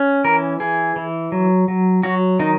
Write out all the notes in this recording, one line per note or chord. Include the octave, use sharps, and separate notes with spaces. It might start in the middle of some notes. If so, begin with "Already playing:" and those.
Already playing: C#4
E3 A#4
E3 G#4
E3
F#3
F#3
F#3 F#4
D#3 D#4